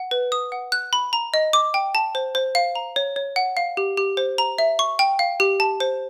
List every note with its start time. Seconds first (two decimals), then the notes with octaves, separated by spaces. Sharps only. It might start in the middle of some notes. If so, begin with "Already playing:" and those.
Already playing: F#5
0.11 B4
0.32 D#6
0.52 F#5
0.72 F#6
0.93 B5
1.13 A#5
1.34 D#5
1.53 D6
1.74 G5
1.95 A5
2.15 C5
2.35 C5
2.55 F5
2.75 A#5
2.96 C#5
3.16 C#5
3.36 F#5
3.57 F5
3.77 G4
3.97 G4
4.17 C5
4.38 A#5
4.58 E5
4.79 C#6
4.99 G5
5.19 F5
5.40 G4
5.60 A5
5.80 C5